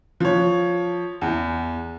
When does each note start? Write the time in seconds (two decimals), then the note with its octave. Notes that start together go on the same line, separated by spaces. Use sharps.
0.20 F3 C#5
1.21 E2